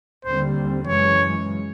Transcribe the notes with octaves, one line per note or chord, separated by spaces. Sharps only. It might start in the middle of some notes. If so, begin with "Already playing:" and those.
D#2 D3 G3 C4 C5
F#2 C#3 E3 G#3 C#5